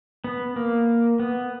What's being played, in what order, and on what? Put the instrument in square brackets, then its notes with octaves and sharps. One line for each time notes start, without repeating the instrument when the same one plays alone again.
[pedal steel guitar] B3
A#3
B3